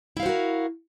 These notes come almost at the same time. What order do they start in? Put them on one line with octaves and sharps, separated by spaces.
E4 F5 C5 F#4 A#4